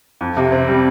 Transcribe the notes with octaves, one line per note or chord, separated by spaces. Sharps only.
F2
C3
C4
G3